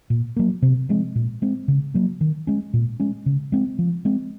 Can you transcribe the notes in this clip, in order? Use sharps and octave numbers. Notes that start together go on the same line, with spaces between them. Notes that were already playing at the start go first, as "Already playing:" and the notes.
A#2
F#3 A#3
C3
F3 G#3 C4
A#2
G#3 C4
C#3
F#3 A#3
D#3
G#3 C#4
A#2
G#3 C#4
C#3
G#3 C4
F3
G#3 C4